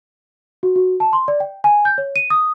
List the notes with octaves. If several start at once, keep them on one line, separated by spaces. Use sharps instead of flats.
F#4
F#4
A5
C6
D5
G5
G#5
G6
C#5
D#7
D#6